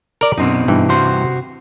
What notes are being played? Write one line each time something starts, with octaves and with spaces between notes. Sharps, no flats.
A#4 D5
F#2 B2 C4 D#4
G2 E3
C3 F#4 C5